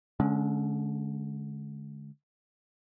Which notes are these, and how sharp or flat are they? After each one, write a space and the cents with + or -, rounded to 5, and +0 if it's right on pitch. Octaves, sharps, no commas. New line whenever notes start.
D3 -10 G#3 +30 C#4 +0